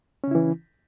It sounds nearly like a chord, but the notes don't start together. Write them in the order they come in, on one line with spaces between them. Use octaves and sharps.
C#4 C#3 E4 E3